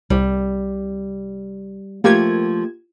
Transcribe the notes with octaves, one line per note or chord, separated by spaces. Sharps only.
C2 G3
F3 A3 A#3 G4 G#6